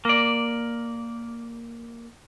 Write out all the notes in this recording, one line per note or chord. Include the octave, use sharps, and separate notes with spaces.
A#3 D5